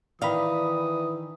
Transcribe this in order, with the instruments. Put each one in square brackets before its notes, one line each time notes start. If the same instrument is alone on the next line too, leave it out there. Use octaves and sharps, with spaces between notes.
[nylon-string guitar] D#3 F5 [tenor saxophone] E3 [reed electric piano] D5 B5 [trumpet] D#6